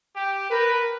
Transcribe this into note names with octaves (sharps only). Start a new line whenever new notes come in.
G4
A#4 B4